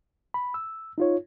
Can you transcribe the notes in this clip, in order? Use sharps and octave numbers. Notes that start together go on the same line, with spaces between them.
B5
E6
D#4 F4 C#5